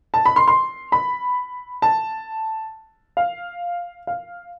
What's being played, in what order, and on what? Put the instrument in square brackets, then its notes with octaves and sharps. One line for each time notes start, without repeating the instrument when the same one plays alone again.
[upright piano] A5
B5
C6
C6
B5
A5
F5
F5